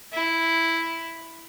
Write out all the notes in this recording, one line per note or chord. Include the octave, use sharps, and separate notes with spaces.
E4